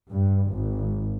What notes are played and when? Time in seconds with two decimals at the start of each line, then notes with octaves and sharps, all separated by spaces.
0.11 G2
0.51 G#1